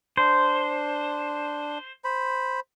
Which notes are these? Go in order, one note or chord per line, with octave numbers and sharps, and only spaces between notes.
D4 C5
C5 B5